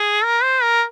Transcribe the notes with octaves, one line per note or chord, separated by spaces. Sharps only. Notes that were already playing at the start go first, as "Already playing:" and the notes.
Already playing: G#4
A#4
C5
A#4